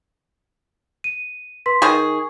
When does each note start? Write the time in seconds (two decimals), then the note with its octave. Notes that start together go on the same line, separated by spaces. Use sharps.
1.04 D#7
1.66 B4 C6 B6
1.82 D#3 G#4 C#6